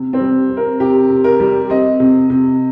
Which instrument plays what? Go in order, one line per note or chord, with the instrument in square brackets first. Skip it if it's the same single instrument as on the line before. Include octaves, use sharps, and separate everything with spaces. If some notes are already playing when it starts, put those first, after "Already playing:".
Already playing: [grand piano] C3
[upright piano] C4
[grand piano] G3
C4
[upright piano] A#4
[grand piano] C3 [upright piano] G4
[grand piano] C3
[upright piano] A#4
[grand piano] G3
[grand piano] C4 [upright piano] D#5
[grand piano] C3
C3